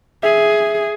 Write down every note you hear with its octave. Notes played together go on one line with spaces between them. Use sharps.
G#4 E5